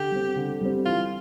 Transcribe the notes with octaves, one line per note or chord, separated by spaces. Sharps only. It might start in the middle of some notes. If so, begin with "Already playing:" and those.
Already playing: D3 G4
G3 C4
D3
G3 C4
E3 F4